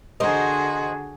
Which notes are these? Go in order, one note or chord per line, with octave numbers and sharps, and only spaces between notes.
D3 F#4 G#4 A#4 C5 D#5